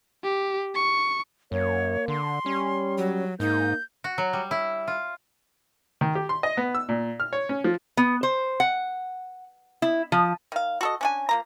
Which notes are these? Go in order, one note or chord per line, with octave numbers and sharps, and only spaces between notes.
G4
C#6
F#2 A#3 C#5
D3 C6
G3 C#4
F#3
G#2 A#3 D#4 G6
F#4
F#3
G3
E4
F4
D#3
G4
C6
D#5
B3
E6
A#2
F6
C#5
C#4
F3
B3
C5
F#5
E4
F3
D#3 F5
F#4 A4 D#5
C#4 D4 G#5
F3 A#3 A#5